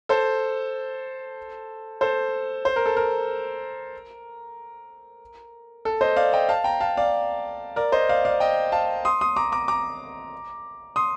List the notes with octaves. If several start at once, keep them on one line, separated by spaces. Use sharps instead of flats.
A4 C5
A4 C5
C5
A#4
A4
A#4
A4
C5 D#5
D5 F5
D#5 G5
F5 A5
G5 A#5
F5 A5
D5 F5
A#4 D5
C5 D#5
D5 F5
D5 F5
D#5 G5
F5 A5
C6 D#6
C6 D#6
A#5 D6
A#5 D6
A#5 D6
C6 D#6